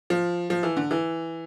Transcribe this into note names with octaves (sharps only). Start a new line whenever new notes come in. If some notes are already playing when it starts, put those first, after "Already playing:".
F3
F3
E3
D3
E3